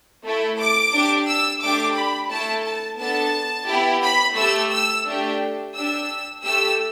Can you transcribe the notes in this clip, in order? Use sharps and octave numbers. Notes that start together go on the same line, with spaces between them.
A3 E4 A4
D6
D4 G4
E6
A3 D4 G4 D6
B5
A3 E4 A4 A5
A5
B3 D4 A4 A5
B3 E4 G4
B5
A3 G4 E6
E6
A3 D4 G4
D4 G4 E6
A3 G4 E6